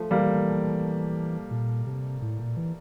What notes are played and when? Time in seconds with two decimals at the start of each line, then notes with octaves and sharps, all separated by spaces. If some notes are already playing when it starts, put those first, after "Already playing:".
Already playing: F3 A3
0.11 E3 G3 A#3
1.51 A#2
1.87 C3
2.22 A2
2.39 A#2
2.56 E3